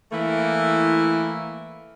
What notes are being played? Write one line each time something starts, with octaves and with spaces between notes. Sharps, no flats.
E3 A3 A#3 E4